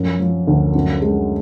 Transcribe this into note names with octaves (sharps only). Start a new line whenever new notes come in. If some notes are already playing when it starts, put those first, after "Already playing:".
Already playing: F#2 F3
F3
D2
F#2
G#3